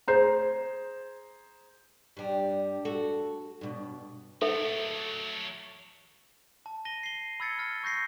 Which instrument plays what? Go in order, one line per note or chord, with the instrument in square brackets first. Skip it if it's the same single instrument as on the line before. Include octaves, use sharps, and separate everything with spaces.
[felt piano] G#4 C5 A#5
[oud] G2 G3
F#4 A4
G2 B2
[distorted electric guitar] F#3 A3 [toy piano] A4 E5
[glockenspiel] A5
A#6 D#7 G7
C7 G7
B5 E6 G#6 A6 C#7 G7
F6 A6
C#6 G6 A#6 C7